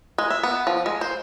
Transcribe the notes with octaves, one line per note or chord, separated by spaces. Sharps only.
G#3
E5
B3
F3
G#3
C5